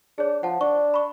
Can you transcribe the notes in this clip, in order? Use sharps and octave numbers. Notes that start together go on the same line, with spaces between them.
D4 G#4 C#5
F3 F#5 A5
D4 C#6
B5 C#6